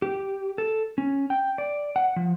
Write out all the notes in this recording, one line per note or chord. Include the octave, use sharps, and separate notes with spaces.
G4
A4
C#4
G5
D5
F#5
F3